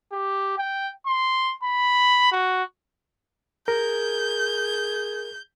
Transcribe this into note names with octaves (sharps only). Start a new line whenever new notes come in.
G4
G5
C6
B5
F#4
G#4 A#4 G6